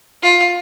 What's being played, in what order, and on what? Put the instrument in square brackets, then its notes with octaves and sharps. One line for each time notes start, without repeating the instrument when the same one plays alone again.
[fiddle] F4